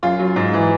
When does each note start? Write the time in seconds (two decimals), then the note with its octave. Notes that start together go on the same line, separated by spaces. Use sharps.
0.03 F#2 F4
0.19 F#3
0.36 G#2
0.53 E3